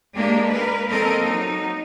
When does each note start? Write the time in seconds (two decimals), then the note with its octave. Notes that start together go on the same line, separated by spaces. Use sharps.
0.14 G#3 A#3 D4 G4
0.47 A#4 B4
0.90 F3 A#3 C4 A4 A#4 D#5
1.19 F#3 D#4